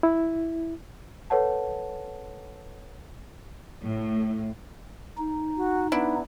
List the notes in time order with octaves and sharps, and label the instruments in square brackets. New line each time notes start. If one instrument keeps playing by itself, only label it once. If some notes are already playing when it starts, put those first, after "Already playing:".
[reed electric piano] E4
[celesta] A4 B4 C#5 F#5 A5
[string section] A2
[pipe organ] D#4
[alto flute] F#4
[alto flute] B3 [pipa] D4 E4